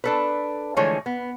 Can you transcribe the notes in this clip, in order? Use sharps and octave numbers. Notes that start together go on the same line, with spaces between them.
D4 A4 B4
D3 E3 F3 G#3 A3 C#5
B3